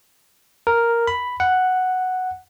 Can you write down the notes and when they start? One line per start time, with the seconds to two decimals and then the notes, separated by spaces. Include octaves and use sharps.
0.67 A#4
1.07 B5
1.40 F#5